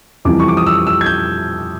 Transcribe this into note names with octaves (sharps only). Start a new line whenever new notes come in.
F2 C3 E3 G3 D6
C#6
D6
D#6
E6
E6
G#6
G6